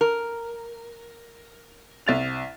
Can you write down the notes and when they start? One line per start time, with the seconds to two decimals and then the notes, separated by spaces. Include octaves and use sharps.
0.01 A#4
2.07 C2 A6 F7